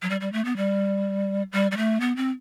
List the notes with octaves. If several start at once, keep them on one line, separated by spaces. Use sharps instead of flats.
F#3
G3
G3
A3
B3
G3
G3
G3
A3
B3
C4